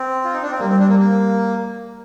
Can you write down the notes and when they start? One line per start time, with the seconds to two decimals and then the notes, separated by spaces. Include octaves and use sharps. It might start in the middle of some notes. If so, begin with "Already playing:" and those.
Already playing: C4
0.25 F4
0.33 D#4
0.42 D4
0.51 C4
0.59 G3 A#3
0.69 C4
0.80 D4
0.89 A#3
0.99 A#3